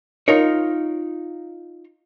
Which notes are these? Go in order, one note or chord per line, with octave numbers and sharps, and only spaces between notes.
D#4 F4 A#4 C#5